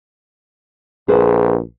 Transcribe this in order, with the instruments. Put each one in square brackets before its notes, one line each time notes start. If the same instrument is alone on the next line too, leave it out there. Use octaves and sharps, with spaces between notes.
[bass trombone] A#1 [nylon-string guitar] G#4 B4 C5